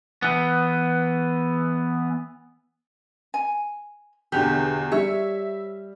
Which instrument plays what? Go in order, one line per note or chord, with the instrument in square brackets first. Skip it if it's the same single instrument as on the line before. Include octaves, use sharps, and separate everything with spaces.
[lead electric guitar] E3 B3
[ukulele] G#5
[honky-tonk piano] E2 B2 [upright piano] D3 [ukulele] G4
[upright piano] G3 [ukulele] C#5 [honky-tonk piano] E5